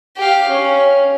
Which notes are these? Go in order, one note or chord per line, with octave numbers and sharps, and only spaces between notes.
G4 F5
C#4